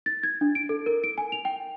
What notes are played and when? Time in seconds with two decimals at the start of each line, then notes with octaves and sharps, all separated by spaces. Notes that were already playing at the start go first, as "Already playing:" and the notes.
0.06 A6
0.23 G#6
0.41 D4
0.55 D7
0.69 A4
0.86 A#4
1.04 D7
1.18 G#5
1.32 F7
1.45 G5